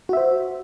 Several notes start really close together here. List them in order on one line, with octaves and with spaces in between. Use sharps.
F#4 E5 C5